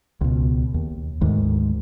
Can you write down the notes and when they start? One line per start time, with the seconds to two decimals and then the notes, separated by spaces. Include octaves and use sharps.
0.21 C#2 B2
0.74 D#2
1.21 D2 G#2 D#3